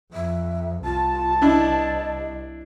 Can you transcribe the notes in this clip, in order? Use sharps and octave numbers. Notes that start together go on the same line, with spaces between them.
F2 E5
C2 F4 A5
D4 E4 D#5